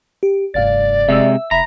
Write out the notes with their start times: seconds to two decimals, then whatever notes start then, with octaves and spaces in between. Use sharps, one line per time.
0.23 G4
0.54 F1 G2 D5 F5 A6
1.09 C3 G#3 E5 E6
1.51 F1 E5 A#5 B5